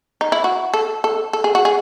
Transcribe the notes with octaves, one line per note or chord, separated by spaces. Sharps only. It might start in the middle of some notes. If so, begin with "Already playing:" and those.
D#4
E4
F#4
A4
A4
A4
G#4
F#4
G#4